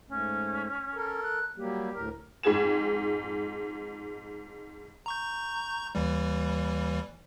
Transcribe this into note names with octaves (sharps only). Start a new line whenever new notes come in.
G#2 A3 C#4
A4 A#4
F#6
F#3 G3 A#3 G4
D2 A2 A#4
F2 G#2 G#4 G#6 E7
A#5 C#6 G6
D#2 E3 G3